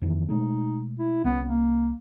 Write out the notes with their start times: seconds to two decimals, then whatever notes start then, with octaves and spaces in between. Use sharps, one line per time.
0.02 F2 D#3 E3
0.29 B2 G#3 A3 D#4
0.99 E4
1.24 C2 B3 C#4
1.48 A#3